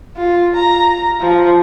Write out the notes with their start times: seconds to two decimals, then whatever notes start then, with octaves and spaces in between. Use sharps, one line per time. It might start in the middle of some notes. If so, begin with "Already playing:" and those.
0.17 F4
0.56 A#5
1.20 F3